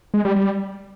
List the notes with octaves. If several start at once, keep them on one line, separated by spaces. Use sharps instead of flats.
G#3
G3
G3